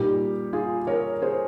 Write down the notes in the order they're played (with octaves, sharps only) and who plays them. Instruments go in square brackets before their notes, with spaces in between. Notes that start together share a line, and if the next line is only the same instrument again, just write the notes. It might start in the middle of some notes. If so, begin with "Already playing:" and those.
Already playing: [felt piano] A#2 G3 D#4 G4
F4 G#4
A#4 C#5
G#4 C5